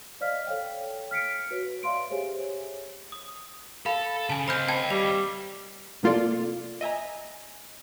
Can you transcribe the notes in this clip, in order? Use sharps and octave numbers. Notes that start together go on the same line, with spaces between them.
C5 D5 D#5 F5 F6 B6
A4 C#5 F5 G5
F6 B6 C#7 D7
F#4 B4 C#5
D5 E5 F5 C6 D7
G4 G#4 C5 C#5 E5 G#5
D#6
A4 F5 B5
C#3 G#5 A5
C4 D#5 F5 B5 F6 G6
G5 A5 G#6
G3 F7
C3 A#3 F4 A4 D5
D#5 E5 G#5 A#5